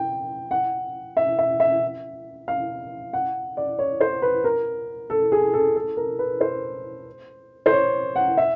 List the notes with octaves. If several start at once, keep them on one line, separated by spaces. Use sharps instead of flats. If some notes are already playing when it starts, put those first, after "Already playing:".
Already playing: G5
F#5
E5
E5
E5
F5
F#5
D5
C#5
C5
B4
A#4
A4
G#4
A4
A4
A#4
B4
C5
C5
C#5
F#5
E5